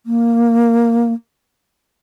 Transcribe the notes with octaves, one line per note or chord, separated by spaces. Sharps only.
A#3